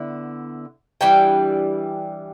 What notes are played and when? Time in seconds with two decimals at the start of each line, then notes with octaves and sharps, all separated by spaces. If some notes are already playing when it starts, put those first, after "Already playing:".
Already playing: D3 B3 E4
1.01 E3 G3 D4 G5